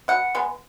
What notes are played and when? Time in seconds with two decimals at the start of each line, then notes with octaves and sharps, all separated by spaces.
0.08 B2 F#5
0.35 G#3 B3